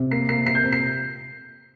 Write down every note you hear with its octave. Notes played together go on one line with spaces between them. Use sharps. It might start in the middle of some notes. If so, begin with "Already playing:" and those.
Already playing: C3
A#3 C7
A#3 C7
C3 C7
G6
C3
C7